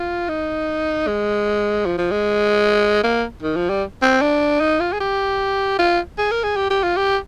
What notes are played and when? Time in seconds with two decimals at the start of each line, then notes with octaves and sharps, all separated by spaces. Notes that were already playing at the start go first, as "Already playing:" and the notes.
Already playing: F4
0.28 D#4
1.07 G#3
1.85 F3
1.98 F3
2.11 G#3
3.04 A#3
3.42 D#3
3.56 F3
3.69 G3
4.02 C4
4.21 D4
4.60 D#4
4.80 F4
4.93 G#4
5.00 G4
5.79 F4
6.18 G#4
6.31 A#4
6.43 G#4
6.56 G4
6.70 G4
6.83 F4
6.97 G4